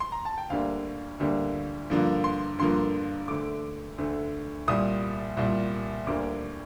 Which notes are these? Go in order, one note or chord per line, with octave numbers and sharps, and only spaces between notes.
C6
A#5
A5
G5
D2 D3 G3 A#3 F5
D2 D3 G3 A#3
G2 D3 F3 A#3
C6
G2 D3 F3 A#3 C6
D2 D3 A3 D6
D2 D3 A3
C2 A#2 G3 D#6
C2 A#2 G3
D2 D3 G3 A#3 D6